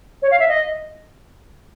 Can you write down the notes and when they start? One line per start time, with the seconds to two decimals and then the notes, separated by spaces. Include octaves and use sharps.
0.22 C#5
0.31 F5
0.40 E5
0.48 D#5